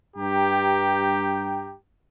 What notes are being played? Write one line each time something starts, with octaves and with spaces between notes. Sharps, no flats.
G2 G4 G5 A#5